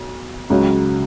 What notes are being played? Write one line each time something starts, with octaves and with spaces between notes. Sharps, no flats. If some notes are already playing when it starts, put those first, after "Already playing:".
Already playing: B1
C#2 C#3 F#3